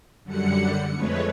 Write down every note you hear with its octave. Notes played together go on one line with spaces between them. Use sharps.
F#2 D3 G3 F#5 C#7
F2 G#3 A3 B4 C#5